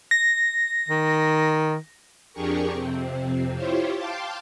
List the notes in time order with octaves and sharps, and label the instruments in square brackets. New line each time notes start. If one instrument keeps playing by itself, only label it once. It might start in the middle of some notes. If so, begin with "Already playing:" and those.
[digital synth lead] A#6
[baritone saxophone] D#3
[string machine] F2 D4 G4 G#4 A#4 C#6
F2 C3 C4
E4 F4 G4 C5 C#5
F5 G5 A5 C6 D6